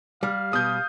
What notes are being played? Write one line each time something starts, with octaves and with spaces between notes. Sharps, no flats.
G3 F5
B2 G3 D#6 G6